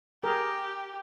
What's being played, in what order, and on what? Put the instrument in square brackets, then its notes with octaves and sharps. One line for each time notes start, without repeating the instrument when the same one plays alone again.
[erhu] G4 [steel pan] G#4 A#4